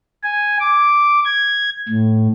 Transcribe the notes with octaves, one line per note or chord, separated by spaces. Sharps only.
G#5
D6
G#6
A2